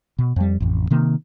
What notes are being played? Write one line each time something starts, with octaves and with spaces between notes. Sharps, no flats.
B2
F2 G3
A1 F2
C3 D#3 A#3